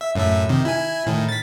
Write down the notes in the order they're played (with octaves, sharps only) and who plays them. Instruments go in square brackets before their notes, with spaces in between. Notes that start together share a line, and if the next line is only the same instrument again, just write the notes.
[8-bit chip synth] E5
F#2 A2 E5
C3 D#3
E4 G#5
A2 D#3
A6 B6